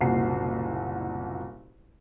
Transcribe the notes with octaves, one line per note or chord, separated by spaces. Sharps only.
F#1 C2 A#2 F#4 C7